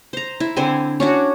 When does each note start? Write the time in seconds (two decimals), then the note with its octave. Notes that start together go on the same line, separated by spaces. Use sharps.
0.13 C5 A#5
0.40 E4
0.56 D3 C4 C5 G#5
1.00 C#4 D4 F#4